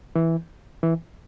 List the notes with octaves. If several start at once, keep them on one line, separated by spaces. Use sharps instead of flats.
E3
E3